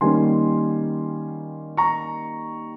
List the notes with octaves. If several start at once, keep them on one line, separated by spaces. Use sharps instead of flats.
D#3 G3 A#3 C#4 G#5 C6
A#5 C#6